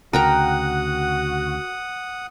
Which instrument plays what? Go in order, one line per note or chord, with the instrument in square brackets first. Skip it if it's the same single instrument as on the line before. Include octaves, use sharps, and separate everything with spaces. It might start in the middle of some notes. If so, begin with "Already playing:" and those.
[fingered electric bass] D2 C#3 [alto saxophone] F#4 [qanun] A#4 G5 A#5 [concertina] F#5 D#6